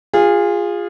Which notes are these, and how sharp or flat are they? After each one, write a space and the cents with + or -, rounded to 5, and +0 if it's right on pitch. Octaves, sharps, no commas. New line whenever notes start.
F4 +5 G#4 -25